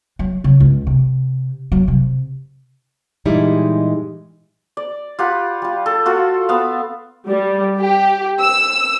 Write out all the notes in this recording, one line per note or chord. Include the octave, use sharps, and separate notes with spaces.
F#3
C#3
C#2
C3
F#3
C3
A#2 E3 G3 G#3 D#4 E4
D5
F4 G4 F#5 B5
G3 F4
A4
F4 F#4 A4
B3 F5
G3
G4
E6